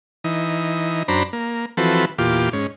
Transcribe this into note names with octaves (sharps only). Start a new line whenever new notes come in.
E3 D#4
F#2 D4 C5 A#5 B5
A#3
E3 F3 C4 F#4 A4 B4
E2 A#2 F4 G4 D6
G#2 C#4